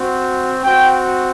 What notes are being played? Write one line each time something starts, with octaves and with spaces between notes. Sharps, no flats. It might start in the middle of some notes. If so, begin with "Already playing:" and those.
Already playing: C4 F#4
C4 F#4 G5